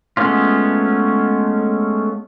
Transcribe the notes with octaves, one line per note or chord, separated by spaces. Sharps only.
G#3 A3 B3 C#4 F4